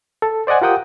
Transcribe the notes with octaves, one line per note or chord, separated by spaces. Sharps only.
A4
C5 D5 D#5 F#5 G#5
F4 G4 A#4 F#5 G5 D#6